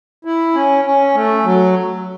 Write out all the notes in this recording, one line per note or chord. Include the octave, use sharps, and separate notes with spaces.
E4
C#4
C#4
A3
F#3